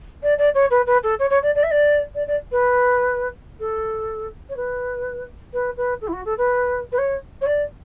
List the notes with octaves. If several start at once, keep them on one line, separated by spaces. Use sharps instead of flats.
D5
D5
C#5
B4
B4
A4
C#5
C#5
D5
D5
E5
D5
D5
D5
B4
A4
C#5
B4
B4
B4
A4
E4
F#4
A4
B4
B4
C#5
C#5
D5